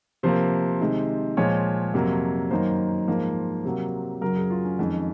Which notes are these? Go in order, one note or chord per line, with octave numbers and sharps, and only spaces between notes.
C3 F3 A#3 C5
C3 D#3 G#3
A#2 F3 G#3 C#5
F2 C3 F#3 A#3
F#2 D#3 A#3 C5
G#2 F3 A#3
C3 F#3 A#3
F#2 C#3 F#3 A#4
G#4
F4
C#4
F2 D#3 G#3